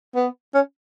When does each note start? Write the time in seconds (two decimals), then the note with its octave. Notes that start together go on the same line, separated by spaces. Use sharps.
0.16 B3
0.54 C#4